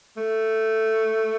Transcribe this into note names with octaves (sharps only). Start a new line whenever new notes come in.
A3